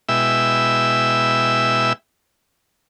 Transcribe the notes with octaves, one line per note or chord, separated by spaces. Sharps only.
B2 G#3 E4 E5 G5 E6